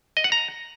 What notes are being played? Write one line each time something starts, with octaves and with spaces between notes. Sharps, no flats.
D#5
F#5
A#5